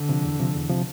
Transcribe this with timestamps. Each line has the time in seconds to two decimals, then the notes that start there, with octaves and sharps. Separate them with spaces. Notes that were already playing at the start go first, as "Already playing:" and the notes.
Already playing: D3
0.09 C3 F3
0.25 E2
0.40 C3 F3
0.55 E2
0.70 C3 F3